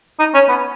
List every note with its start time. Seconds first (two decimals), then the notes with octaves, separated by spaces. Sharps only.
0.19 D#4
0.34 C#4
0.49 B3